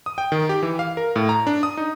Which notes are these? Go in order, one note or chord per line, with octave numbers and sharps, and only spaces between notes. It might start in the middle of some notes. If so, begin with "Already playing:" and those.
D#6
G5
D#3
G4
E3
F5
A#4
A2
A#5
D4
D#6
D#4